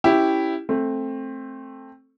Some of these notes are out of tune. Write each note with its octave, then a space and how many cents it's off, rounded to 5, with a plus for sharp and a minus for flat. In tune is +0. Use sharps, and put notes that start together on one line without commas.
C#4 -5 E4 +0 G4 +0
A3 +0 C4 +15